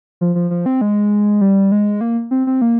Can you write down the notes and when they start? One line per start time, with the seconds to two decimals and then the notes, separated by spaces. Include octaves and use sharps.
0.21 F3
0.35 F3
0.51 F3
0.66 C4
0.81 G#3
1.41 G3
1.72 G#3
2.01 A#3
2.31 C4
2.47 C4
2.62 A#3